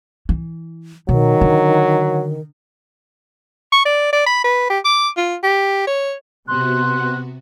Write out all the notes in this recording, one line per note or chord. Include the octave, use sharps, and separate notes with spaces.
E3
B2 D#3 F#3
D3
C#6
D5
D5
B5
B4
G4
D6
F4
G4
C#5
C3 B3 F#4 C6 F#6